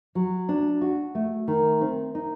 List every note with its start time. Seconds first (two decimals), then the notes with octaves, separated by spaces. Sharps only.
0.15 F#3
0.49 D4
0.81 F#4
1.15 A3
1.48 D#3
1.81 C4
2.15 D#4